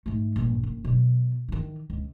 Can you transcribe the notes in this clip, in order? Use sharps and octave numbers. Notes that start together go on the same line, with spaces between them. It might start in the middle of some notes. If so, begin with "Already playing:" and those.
G#2 A3
A#1 G2
F#1
B2 F#3
D#3 E3
C#2